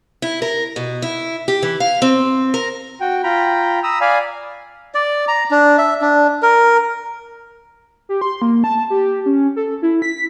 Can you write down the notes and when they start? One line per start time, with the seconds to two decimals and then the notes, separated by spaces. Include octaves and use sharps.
0.22 E4
0.42 A#4
0.76 B2
1.02 E4
1.48 G4
1.63 E3
1.80 F5
2.02 C4
2.54 A#4
3.00 F#4 G5
3.24 F4 G5 A#5 B5
3.83 A#5 B5 D#6 E6
4.01 D5 F5 G#5 B5
4.95 D5
5.28 A#5
5.51 D4
5.78 E5
6.02 D4
6.42 A#4
8.09 G4
8.21 C6
8.42 A#3
8.64 A5
8.90 G4
9.26 C#4
9.56 A4
9.82 E4
10.02 B6